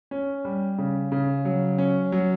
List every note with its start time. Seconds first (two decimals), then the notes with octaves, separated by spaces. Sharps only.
0.11 C#4
0.45 G3
0.78 C#3
1.12 C#3
1.45 F#3
1.78 C#4
2.12 F#3